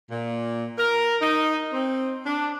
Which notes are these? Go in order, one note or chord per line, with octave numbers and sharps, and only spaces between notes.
A#2
A#4
D#4
C4
D4